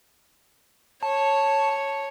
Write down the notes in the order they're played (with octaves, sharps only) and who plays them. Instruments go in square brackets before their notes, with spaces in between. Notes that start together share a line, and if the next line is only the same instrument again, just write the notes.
[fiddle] C#5 [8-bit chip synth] A5